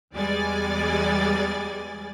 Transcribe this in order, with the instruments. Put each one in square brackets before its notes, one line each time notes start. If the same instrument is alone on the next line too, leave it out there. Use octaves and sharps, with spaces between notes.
[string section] E2 G3 G#3 D5 G#5 A6